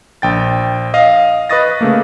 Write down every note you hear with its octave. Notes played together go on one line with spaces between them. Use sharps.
A#1 G5 A6
D#5 F5
B4 D#5 C#6 D#6 A6 A#6
C#3 A3 A#3